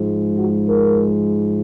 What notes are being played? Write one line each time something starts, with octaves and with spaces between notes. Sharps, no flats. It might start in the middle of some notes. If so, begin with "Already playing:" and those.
Already playing: G#2 F3 G#3
F#4
A#4